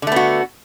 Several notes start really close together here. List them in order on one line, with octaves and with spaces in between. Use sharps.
D3 A3 B3 F#4